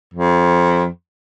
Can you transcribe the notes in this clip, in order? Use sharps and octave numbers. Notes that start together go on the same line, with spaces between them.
F2